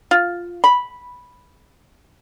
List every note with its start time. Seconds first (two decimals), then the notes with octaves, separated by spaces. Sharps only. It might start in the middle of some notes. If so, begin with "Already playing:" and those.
0.11 F4
0.64 B5